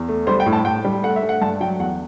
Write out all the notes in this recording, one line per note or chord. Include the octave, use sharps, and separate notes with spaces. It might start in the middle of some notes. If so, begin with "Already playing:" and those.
Already playing: E2
A3
G3 C5
G5
A2
A5
A2 G5
G3
A3 F#5
E5
A3
F#5
G2 A5
F#3 G5
E2 F#5